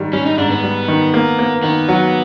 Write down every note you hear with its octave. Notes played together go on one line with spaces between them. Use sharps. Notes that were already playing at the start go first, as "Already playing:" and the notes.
Already playing: G#2 D#3 G3
G3 C#4
D#4
G#2 D4
B3
G3
D#3
A#3
A#3
D#3 B3
F#3